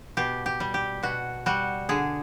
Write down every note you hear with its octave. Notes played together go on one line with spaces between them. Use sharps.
B2 G4
G4
G3
G4
B2 F#4
G3 F#4
D3 G#4